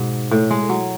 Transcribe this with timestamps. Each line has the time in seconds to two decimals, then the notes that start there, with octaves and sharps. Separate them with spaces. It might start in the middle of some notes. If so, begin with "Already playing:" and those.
Already playing: G#2 B2
0.31 A2
0.51 G#3
0.69 F#3